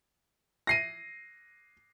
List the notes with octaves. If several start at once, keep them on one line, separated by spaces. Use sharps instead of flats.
A#6 C7 D#7